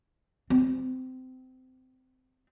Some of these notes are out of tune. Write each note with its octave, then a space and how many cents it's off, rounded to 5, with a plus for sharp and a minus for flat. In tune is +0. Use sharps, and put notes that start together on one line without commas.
C4 -25